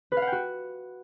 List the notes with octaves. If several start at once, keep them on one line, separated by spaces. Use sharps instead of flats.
B4
F5
F#5
G5
F#4